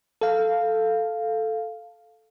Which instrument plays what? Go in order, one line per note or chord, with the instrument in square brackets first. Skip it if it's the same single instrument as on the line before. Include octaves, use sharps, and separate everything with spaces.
[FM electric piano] A4 F5